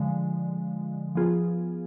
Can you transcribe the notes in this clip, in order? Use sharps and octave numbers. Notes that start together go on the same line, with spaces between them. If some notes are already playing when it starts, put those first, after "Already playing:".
Already playing: D3 F3 G#3
F3 B3 F4 G#4